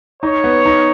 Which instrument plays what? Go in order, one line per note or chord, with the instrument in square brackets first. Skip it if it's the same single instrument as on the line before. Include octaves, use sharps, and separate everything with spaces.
[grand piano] D#4 [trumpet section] C#5
[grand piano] B3
D#4